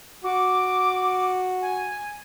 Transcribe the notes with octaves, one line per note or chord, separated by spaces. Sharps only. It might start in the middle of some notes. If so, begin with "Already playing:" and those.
F#4 D6
G#5